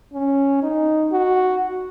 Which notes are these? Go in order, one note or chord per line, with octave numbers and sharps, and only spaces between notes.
C#4
D#4
F#4